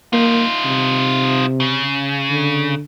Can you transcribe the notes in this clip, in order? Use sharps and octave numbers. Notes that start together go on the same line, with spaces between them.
A#3 D#4 F4
C3
C#3
D3